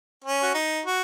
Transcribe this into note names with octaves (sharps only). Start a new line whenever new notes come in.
C#4
F#4
D#4
F#4